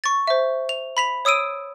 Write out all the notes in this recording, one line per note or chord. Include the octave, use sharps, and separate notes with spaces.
C#6 A6
C5 E5
F7
B5 B6 F7
C#5 D#6 E6 D7 D#7